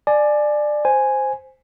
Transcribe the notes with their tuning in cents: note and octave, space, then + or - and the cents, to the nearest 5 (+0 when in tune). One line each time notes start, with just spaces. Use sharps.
D5 +20 G#5 +25
C5 +0 G#5 +0